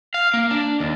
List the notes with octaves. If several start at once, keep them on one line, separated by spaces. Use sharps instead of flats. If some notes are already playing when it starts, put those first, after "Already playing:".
F5
A#3
D4
D#2